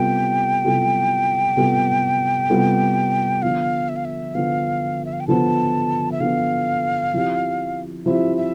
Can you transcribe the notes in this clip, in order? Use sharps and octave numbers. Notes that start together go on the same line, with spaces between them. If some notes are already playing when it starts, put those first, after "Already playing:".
Already playing: C3 G3 B3 F4 A4 G5
C3 G3 B3 F4 A4
C3 G3 B3 F4 A4
C3 G3 B3 F4 A4
D3 F3 B3 F5
E5
F5
E5
D3 F3 B3 F5
E5
F5
G5
D3 F3 B3 A5
E5
D3 F3 B3 F5
F3 C4 E4 G4
F3 C4 E4 G4 E5
E5